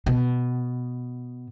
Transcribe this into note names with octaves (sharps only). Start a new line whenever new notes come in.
B2